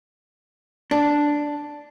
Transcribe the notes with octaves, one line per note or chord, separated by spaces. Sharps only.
D4